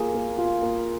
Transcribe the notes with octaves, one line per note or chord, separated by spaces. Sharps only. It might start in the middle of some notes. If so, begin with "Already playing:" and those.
Already playing: A#3 F4 G#4
A#3
F4
A#3